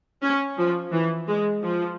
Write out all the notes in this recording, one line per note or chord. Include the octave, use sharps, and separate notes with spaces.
C#4
F3
E3
G#3
F3